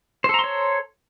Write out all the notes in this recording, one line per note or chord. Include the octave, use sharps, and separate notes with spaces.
A4 C5 C#5 A#5 C6